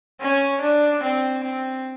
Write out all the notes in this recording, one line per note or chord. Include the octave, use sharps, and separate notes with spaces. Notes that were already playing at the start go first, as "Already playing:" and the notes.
C#4
D4
C4
C4